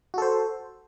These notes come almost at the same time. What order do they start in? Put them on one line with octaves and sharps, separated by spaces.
F#4 A4 C5